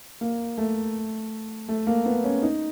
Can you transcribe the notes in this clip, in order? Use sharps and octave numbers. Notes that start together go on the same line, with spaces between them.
A#3
A3
A3
A#3
B3
C#4
D#4